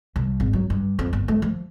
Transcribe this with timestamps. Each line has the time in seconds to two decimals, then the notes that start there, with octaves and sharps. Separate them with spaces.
0.16 C2
0.40 G#1
0.53 F#3
0.70 G2
0.99 F2
1.13 G1
1.28 A3
1.42 F3